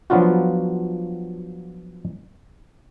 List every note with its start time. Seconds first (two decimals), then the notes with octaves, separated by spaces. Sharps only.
0.10 F3 F#3 B3 D4 F4 F#4